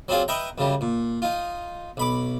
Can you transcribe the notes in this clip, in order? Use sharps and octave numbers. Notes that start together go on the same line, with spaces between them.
F#3 C4 D4 F4 G#4
B4 D#5 E5 G5 A#5
F#2 C#3 G3
A#2
D#4 F4
B1 B5 D6